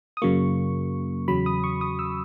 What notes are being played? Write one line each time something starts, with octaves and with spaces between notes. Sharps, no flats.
D#6
F#2 C#3 F#3 A#3 C#6
E2 C#3 F#3 B5
D#6
C#6
D#6
E6